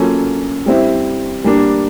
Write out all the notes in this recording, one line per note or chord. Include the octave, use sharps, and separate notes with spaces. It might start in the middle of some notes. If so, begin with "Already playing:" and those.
Already playing: F#3 A#3 C#4 F4 A4
G3 C4 E4
G3 A#3 D4